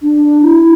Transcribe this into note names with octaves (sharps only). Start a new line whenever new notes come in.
D4
E4